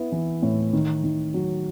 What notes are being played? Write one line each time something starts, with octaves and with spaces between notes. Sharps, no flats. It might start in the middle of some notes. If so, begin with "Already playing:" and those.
Already playing: B3 E4
E3
A2
D#3
D#3
F#3